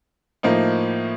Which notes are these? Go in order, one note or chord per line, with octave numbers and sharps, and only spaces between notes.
A2 F3 A#3 D#4